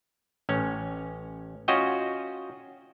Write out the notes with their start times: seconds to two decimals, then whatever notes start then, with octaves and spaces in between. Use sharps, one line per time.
0.49 A1 C#4
1.68 C#4 F4 F#4 D#5 G5